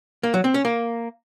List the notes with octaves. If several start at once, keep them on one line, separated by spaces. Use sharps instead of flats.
A#3
F#3
C4
C#4
A#3